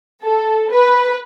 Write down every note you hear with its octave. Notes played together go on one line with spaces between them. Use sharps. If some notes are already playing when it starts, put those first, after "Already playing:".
A4
B4